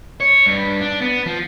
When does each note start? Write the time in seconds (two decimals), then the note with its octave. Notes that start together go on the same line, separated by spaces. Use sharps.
0.20 C#5
0.46 G2
0.81 D4
1.02 B3
1.26 F3